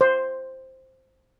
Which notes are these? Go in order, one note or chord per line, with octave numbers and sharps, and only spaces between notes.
C5